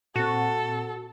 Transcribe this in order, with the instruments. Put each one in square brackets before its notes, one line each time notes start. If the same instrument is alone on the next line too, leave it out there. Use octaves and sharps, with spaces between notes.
[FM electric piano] A#2 C4 [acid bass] F#4 [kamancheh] A4